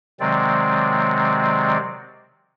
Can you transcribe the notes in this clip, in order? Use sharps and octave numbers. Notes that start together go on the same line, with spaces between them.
C3 D#3 F#3 G#3 C4 D5